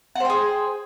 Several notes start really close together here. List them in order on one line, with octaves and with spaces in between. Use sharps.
F#5 C5 G5 G#4